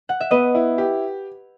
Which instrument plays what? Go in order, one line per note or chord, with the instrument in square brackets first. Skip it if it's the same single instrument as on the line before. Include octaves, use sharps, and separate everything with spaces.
[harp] F#5
E5
[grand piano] B3 [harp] B4 D#5
[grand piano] E4
G4